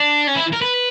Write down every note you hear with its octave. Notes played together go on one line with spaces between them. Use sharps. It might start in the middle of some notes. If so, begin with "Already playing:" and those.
Already playing: D4
C#4
E4
A#4
B4